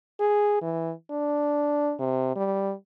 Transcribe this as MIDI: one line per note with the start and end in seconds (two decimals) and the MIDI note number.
0.20 0.59 68
0.62 0.92 52
1.11 1.94 62
1.99 2.36 48
2.36 2.74 55